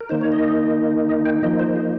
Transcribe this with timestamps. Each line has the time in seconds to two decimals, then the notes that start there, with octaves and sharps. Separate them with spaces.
0.01 A#4
0.09 D#3 A#3 D#4 C5
0.21 C#5
0.32 D#5
1.09 D#5
1.25 G5
1.43 F3 A#3 D#4 D#5
1.59 C5
1.76 G#4